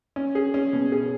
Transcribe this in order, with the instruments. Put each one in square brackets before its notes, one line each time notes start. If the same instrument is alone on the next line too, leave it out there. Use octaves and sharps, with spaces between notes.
[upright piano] C#4
G#4
C#4
B2
G#4